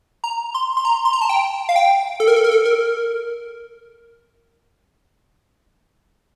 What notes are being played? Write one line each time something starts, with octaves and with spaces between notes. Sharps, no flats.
A#5
C6
C6
A#5
C6
A#5
A5
G5
F5
G5
A4
A#4
A4
A#4
A4
A#4